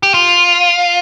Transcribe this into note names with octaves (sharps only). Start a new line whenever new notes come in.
G4
F4